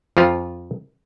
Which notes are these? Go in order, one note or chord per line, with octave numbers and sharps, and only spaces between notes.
F2 F3 F4